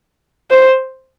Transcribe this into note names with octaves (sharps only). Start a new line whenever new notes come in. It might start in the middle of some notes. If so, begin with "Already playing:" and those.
C5